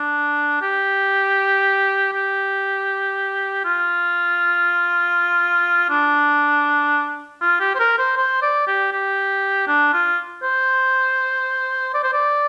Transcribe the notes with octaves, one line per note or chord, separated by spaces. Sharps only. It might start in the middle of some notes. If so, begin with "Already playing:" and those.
Already playing: D4
G4
G4
F4
D4
F4
G4
C5
A#4
C5
C5
D5
G4
G4
D4
F4
C5
D5
C5
D5